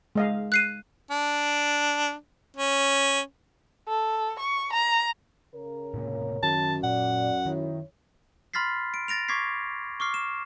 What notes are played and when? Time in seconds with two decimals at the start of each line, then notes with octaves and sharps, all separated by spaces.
0.15 G#3 D#5 F5
0.52 F#6 C7 D#7
1.11 D4
2.57 C#4
3.88 A4
4.39 C#6
4.73 A#5
5.54 C#3 A#4 C#5
5.94 A2 C3 A#3
6.43 F#2 D#3 A5
6.84 A#2 D5 F#5
7.46 D#3 E4 C#5
8.54 B5 C6 F6 A6 B6 C7
8.94 D7
9.08 A6 A#6 D7 F7
9.28 C#6 D6 G#6 B6 C7
10.00 C#6 D6 F6 C7
10.14 E7